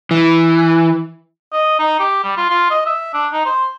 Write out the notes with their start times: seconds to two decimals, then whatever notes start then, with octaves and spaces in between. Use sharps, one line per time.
0.11 E3
1.53 D#5
1.79 D#4
2.00 G4
2.24 G3
2.37 F4
2.50 F4
2.71 D#5
2.86 E5
3.14 D4
3.33 D#4
3.46 C5